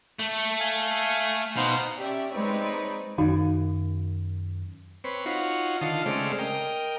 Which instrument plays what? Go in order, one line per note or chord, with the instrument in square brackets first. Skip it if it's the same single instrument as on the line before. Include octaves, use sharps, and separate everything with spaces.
[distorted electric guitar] A3
[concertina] F5 G#5
[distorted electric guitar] B2 [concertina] D#4 C5 F5
[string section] C#4 G4 D5 E5
G#3 C4 D#4 B4 C#5 D5
[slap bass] F#2 D#3 [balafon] D#4 F#4 F5
[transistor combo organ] C4 B4 C#5
D#4 F4 F#4 C#5
D3 D#3 F4 D#5 F5 A5
C#3 G#3 A3 C4 D5 F6
A#4 D#5 G5